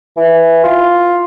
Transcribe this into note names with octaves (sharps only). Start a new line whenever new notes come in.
E3
F4